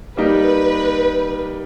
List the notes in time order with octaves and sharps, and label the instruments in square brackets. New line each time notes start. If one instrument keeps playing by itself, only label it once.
[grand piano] G3 A#3 D#4 G4 [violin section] B4